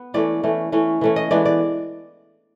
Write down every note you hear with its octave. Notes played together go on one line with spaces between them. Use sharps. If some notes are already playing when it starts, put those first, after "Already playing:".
Already playing: B3
E3 A3 C#4 D5
E3 A3 C#4
E3 A3 C#4
E3 A3 C#4
D#5
E3 G#3 B3 D4 D5
D5